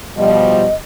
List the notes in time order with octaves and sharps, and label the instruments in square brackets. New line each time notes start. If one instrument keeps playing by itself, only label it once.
[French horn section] B2 F3 G3 [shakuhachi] D#5